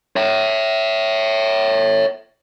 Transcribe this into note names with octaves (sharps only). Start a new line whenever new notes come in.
C#5 E5